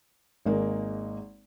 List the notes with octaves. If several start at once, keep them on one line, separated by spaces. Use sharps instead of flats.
G#1 G#3 A#3